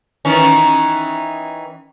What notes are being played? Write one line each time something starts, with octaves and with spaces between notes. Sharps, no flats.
D#3 E3 C#4